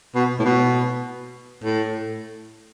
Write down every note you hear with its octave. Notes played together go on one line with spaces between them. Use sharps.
B2
A2
B2
A2